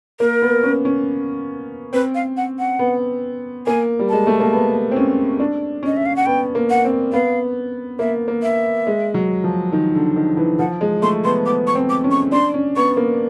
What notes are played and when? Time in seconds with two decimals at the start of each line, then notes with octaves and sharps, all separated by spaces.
0.20 A#3 A#4
0.42 B3
0.63 C#4
0.85 C#4
1.93 C4 B4
2.15 F5
2.37 F#5
2.59 F#5
2.79 B3
3.67 A#3 G#5
3.99 G3
4.09 G#3 A5
4.27 A3
4.40 A#3
4.53 B3
4.91 C4
4.96 C#4
5.40 D4
5.83 C#4 D#5
5.97 E5
6.06 F5
6.16 F#5
6.26 B3 G5
6.55 A#3
6.70 F#5
6.85 C4
7.12 B3 F5
7.99 A#3 E5
8.28 A#3
8.43 E5
8.87 G#3
9.14 F#3
9.44 F3
9.73 D#3
9.95 D3
10.16 D#3
10.37 E3
10.59 F3 F#5
10.81 G#3
11.02 A3 C6
11.24 B3 C6
11.46 B3 D6
11.67 C#6
11.75 C4
11.90 D6
12.04 C#4
12.11 C#6
12.32 D4 C6
12.54 C#4
12.76 B3 C#6
12.97 A#3